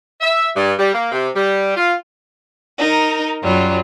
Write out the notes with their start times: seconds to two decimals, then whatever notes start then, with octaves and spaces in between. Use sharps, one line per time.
0.21 E5
0.55 G2
0.78 G3
0.93 A#3
1.12 C3
1.34 G3
1.76 F4
2.78 D#4 A#4
3.43 F#2 F#3 G3 F4